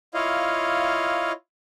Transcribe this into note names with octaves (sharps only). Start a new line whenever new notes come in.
E4 F4 C#5 D#5 F5